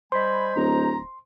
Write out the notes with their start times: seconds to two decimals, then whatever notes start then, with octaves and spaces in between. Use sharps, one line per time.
0.12 G3 C5 D#5 G#5 B5 C6
0.56 D1 A#5